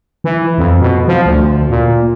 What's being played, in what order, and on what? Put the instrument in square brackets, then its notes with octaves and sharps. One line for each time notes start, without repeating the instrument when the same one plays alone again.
[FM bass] E3
F2
B2
F3
D2
A#2